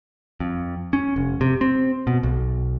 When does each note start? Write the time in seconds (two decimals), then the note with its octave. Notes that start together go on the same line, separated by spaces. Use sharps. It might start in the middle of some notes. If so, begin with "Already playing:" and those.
0.40 F2
0.93 C#4
1.16 F1
1.41 C3
1.61 C4
2.07 B2
2.23 B1